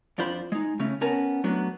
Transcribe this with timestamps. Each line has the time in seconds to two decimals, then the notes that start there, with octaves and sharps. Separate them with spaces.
0.18 F2 D4 F4 C5 B5
0.52 G#3 D#4
0.79 C#3 A3 C#4
1.01 B3 C#4 A#4 A5
1.44 F#3 A3 B3 D4